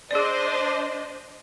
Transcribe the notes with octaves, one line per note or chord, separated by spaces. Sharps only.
D4 G#4 C5 D5 D#5